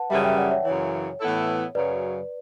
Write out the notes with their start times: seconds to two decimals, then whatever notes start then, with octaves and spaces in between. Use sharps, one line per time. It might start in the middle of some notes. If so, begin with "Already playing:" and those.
Already playing: B4 F#5 A5
0.10 F#2 C#3 E3 G3 E5 G5
0.24 E5 G5
0.38 D5 F#5
0.51 C#5 E5
0.65 F#2 C#3 E3 C#5
1.21 A2 E3 B3 E4 A4
1.75 F#2 C#3 F#3 B4 D5